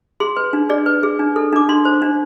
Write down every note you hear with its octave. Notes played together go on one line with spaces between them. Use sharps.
G#4 C6
B4
D4
G#4 D5
B4
G#4
D4
A4
D4 D6
D4 C6
C5
D4